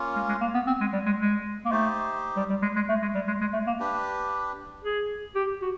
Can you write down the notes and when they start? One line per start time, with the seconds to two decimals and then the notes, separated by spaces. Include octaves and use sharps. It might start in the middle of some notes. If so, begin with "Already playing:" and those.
Already playing: A#3 C#4 F4
0.15 G#3
0.29 G#3
0.41 A#3
0.54 B3
0.67 C4
0.81 G#3
0.93 G3
1.06 G#3
1.19 G#3
1.65 A#3
1.71 A3 D#4 G4 C5
2.37 G3
2.50 G3
2.62 G#3
2.76 G#3
2.89 A3
3.02 G#3
3.15 G3
3.27 G#3
3.41 G#3
3.53 A3
3.67 A#3
3.80 D4 G4 B4
4.83 G#4
5.35 G4
5.62 F#4